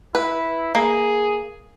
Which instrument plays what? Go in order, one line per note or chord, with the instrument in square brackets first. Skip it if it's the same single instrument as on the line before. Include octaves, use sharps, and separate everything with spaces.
[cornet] E4 [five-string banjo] B4
[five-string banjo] A#3 [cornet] G#4